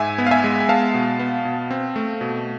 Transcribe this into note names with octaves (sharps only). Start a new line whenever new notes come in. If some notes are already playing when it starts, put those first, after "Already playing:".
Already playing: G#2 E5 G#5
B3
F5
E5 G#5
G#3
G#5
B3 F5 A5
B2
B3
B2
C4
A3
B2